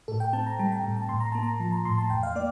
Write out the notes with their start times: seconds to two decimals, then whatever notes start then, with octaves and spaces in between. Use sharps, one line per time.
0.08 A2 A4
0.20 G5
0.33 C4 A5
0.46 A#5
0.59 G3 A5
0.72 G5
0.84 A2
0.97 A5
1.09 A2 C6
1.20 A#5
1.32 A#3 A5
1.43 A#5
1.60 F3 A5
1.72 A#5
1.85 A2 C6
1.98 A5
2.10 E2 G5
2.23 F5
2.35 A#3 D5